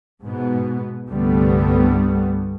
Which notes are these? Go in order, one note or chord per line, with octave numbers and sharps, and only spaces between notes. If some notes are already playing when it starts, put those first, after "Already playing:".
G#2 B2 B3
C2 G2 D3 G3 A3 B3